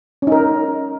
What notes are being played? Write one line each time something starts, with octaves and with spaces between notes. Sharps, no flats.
C#4 D#4 A#4